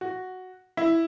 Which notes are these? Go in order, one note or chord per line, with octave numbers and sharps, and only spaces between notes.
F#4
E4